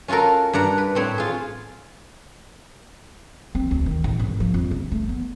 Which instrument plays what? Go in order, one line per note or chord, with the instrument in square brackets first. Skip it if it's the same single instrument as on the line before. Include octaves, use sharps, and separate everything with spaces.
[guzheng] C#4 F4 F#4 A4 A#4
G2 D5 F#5 A#5
B4
A2 C4 C#5
F4 G#4
[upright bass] C4
D2
D#3
A1
G#1
F3
F2
C#3
A3
B3